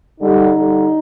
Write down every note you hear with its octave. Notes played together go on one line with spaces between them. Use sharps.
D3 G3 D#4
D3 G3